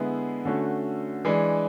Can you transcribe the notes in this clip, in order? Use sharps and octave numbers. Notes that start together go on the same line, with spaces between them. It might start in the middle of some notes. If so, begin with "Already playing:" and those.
Already playing: D3 G#3 B3 E4
D3 A3 C#4 F#4
E3 G#3 D4